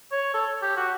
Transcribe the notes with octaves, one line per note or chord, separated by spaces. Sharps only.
C#5
A4
G4
F#4